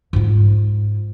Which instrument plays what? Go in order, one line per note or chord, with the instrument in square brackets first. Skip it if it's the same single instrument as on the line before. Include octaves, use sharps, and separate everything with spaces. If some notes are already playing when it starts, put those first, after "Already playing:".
[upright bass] G#2 F4